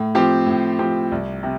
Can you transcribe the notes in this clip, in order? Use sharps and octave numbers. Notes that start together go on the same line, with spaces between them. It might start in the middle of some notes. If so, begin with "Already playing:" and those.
Already playing: A2
F3 C4 G4
A2
F3 C4 G4
C2
C3